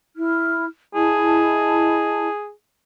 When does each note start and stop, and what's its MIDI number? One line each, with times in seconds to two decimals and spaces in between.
0.15 0.66 64
0.15 0.66 89
0.94 2.28 64
0.94 2.50 68
0.94 2.28 75
0.94 2.28 81